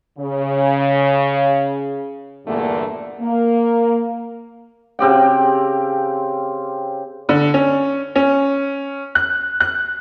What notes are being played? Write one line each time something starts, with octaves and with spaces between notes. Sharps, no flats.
C#3
E2 G2 A#2 D3 A3 A#3
A#3
C#3 C4 G4 G5
D3
C#4
C#4
F#6
F#6